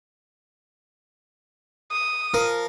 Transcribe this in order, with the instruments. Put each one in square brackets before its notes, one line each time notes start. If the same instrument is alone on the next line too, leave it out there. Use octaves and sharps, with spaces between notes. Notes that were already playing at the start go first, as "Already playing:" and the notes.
[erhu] D#6
[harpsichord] F3 A#4